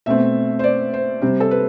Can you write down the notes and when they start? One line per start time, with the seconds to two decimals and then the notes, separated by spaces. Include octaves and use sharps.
0.06 B2 A3 C4 E5
0.59 C5
0.64 D5
0.93 C5
1.22 C3 G3 C4
1.40 A4
1.51 B4